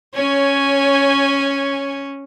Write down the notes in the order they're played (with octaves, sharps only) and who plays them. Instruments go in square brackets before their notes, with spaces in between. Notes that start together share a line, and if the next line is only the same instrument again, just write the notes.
[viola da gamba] C#4 [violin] C#5 G#5